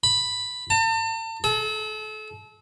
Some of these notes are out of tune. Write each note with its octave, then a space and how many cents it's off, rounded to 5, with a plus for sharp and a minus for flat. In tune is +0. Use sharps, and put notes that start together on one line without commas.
B5 +5
A5 +40
A4 -35